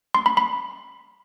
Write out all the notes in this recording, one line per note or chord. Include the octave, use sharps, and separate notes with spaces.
C6
B5
B5